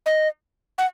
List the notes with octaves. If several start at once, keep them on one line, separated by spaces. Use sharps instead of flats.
D#5
F#5